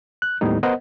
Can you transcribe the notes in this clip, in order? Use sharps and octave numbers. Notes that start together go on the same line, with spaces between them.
F#6
D#2 A2 D#3 G3 B3 D#4
B3 A#4 C5 D#5 F#5